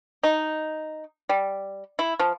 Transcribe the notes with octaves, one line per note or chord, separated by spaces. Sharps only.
D#4
G3
E4
F3